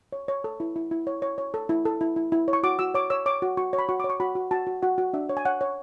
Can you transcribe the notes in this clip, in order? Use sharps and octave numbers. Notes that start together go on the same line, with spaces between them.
C#5
C#5
A4
E4
E4
E4
C#5
C#5
C#5
A4
E4
A4
E4
E4
E4
C#5
C#6
F#4 D6
F#4 E6
C#5 D6
C#5 E6
C#5 D6
F#4
F#4 C#6
C#5
B5
F#4 C#6
C#5 D6
C#6
F#4 B5
F#4
F#4 A5
F#4
F#4 F#5
F#4
D4 E5
C#5
G#5
C#5 F#5
C#5